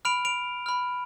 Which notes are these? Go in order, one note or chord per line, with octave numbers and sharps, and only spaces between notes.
B5 F6 D7 F7
D7 F7
B5 F6